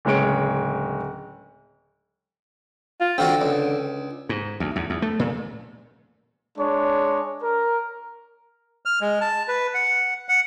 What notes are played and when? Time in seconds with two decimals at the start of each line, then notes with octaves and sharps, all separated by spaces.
0.05 D1 C#3 G#3 C#5 D7
3.00 F4
3.18 D3 C4 F4 F#4
3.42 C#2
4.29 G#2
4.60 D2
4.76 E2
4.90 E2
5.02 A3
5.19 A#2
6.58 G#3 D4 C#5
7.42 A#4
8.85 F6
9.01 G#3
9.21 A5
9.48 B4
9.74 F#5
10.29 F#5